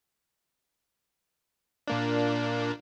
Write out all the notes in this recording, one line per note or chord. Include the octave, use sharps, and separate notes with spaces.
A#2 A#3 D4